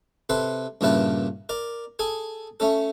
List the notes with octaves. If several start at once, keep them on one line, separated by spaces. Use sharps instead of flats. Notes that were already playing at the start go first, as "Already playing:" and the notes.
C3 A4 B4 C6
G2 A#2 C#3 E4 B4 A5
A#4 D5
G#4 A4 G#5
A3 C#4 A4